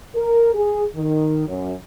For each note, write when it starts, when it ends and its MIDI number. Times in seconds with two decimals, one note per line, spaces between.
0.15 0.52 70
0.53 0.84 68
0.96 1.47 51
1.47 1.74 42